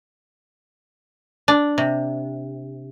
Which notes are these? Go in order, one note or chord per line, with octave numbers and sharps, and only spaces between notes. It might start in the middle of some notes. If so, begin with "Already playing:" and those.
D4
C3